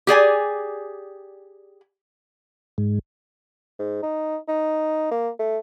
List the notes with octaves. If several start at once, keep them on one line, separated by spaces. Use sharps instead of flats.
G4 G#4 D5 G#5
G#2
G#2
D#4
D#4
A#3
A3